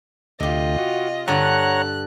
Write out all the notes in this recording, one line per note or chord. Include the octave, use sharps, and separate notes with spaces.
D2 C3 F4 G4 D#5
F#4
G2 D3 C#5 F#5 A#5 F#6